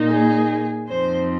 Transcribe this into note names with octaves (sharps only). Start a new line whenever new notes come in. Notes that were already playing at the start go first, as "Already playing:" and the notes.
Already playing: A#2 A#3 D#4
G#4
F2 F3 C4 D#4 C5